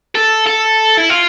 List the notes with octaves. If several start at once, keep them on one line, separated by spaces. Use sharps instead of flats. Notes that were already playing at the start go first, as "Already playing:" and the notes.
A4
A4
E4
F4